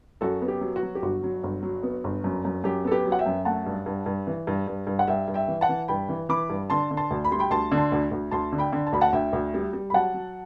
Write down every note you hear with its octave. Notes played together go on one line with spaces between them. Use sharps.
F#2 F#4 A4
B3
G4
F#3
F#4
F#3
G4
G1 F#4
F#3
G1
F#3
B3
G1
F#2
F#2
F#2 G4
B3 A4
G4 B4
F#3
F#5
E5 G5
F#2
A3 F#5 A5
G2
G2
G2
E3
G2
G2
G2
F#5
G2 E5 G5
G2
E5 G5
E3
F#5 A5
E3
G2 G5 B5
E3
E3 B5 D6
G2
D3 A5 C6
D3
A5 C6
D2
B5
G3 C6
G5 B5
D2 A5 C6
D3
A5 C6
D2
D2
D2 A5 C6
D3
G5 B5
D3
A5
D2 B5
F#5 A5
D2 E5 G5
D2
G3
G3
B5
F#3 F#5 A5
F#3